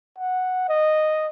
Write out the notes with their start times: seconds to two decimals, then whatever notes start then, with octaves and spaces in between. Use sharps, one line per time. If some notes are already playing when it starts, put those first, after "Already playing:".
0.18 F#5
0.69 D#5